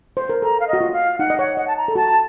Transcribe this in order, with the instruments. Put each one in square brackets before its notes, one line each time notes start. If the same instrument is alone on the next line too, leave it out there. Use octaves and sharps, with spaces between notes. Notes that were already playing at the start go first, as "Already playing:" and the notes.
[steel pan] C5
A#4
[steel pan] A4 [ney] A#5
[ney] F5
D#5
[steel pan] F#4
F4
[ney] F5
[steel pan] D#4 [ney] F#5
[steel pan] D#5
[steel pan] C#5 [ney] F#5
[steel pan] D#5 [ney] F#5
[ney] A5
A#5
[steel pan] A4
[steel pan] F#4 [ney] A5